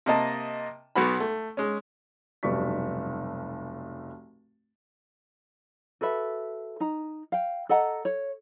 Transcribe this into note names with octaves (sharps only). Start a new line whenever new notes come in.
C3 A#3 D#5 A5
B1 B3 F#4 B5
A3
G#3 C#4
F1 B1 G2 D5 C#6 B6
F#4 A4 B4 E5
D#4 A#5
F5 G5
A4 D#5 F#5 A#5
C#5